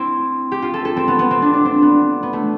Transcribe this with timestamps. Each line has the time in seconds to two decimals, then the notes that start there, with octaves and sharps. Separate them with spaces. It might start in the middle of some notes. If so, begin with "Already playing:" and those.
Already playing: C4 E4
0.52 G4
0.62 F4
0.74 A4
0.85 A4
0.97 C4
1.08 B3
1.19 B3
1.31 C4
1.42 D4
1.54 D4
1.65 C4
1.82 B3
2.23 B3
2.33 A3